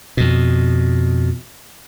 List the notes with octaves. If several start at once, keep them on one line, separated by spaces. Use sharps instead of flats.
F2 B2